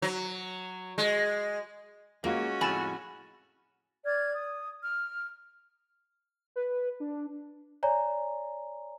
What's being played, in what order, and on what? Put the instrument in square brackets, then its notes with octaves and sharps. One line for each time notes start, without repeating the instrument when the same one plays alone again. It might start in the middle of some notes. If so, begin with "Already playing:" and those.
[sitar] F#3
G#3
[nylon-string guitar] G#3 F4 [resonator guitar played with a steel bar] A#3 [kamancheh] C#4 F#4
[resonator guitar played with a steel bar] F2 A2 G#5 [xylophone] B5 A6 E7
[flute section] D5 F6 G#6
D#6
F6
[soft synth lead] B4
D4
[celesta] C#5 D5 G#5 A#5